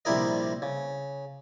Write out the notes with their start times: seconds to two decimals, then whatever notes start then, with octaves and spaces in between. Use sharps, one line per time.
0.05 A#1 C3 G3 E4 A#4 D#5
0.62 C#3